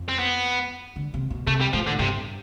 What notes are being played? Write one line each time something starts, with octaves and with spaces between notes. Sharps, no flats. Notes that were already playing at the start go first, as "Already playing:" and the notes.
Already playing: F2
C4
B3
D3
C3
B2
C3 A3
G3
A2 F3
D3
G2 C3